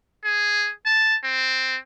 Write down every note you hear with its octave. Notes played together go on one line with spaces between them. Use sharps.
G#4
A5
C4